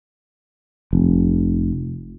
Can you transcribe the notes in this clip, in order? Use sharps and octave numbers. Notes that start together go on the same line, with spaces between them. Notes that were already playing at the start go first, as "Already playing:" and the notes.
F1